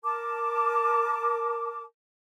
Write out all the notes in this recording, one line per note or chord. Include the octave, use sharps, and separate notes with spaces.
A#4 A5 D6